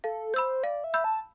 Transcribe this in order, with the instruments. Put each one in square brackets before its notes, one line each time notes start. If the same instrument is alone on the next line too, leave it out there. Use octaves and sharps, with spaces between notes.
[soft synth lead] A4 [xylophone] F5
[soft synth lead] C5 [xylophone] B5 E6 G6
[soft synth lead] D5 [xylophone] F5
[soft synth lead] E5
[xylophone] B5 E6 G6
[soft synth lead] A5